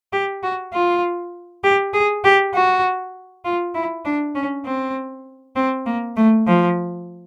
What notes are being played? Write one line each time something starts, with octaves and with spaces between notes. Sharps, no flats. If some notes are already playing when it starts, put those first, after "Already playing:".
G4
F#4
F4
G4
G#4
G4
F#4
F4
E4
D4
C#4
C4
C4
A#3
A3
F3